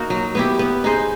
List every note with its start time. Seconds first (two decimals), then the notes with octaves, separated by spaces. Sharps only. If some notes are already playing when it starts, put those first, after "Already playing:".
Already playing: A#3 D#4 F#4
0.10 F#3
0.35 B3 E4 G4
0.59 B3
0.84 D#4 G#4 C5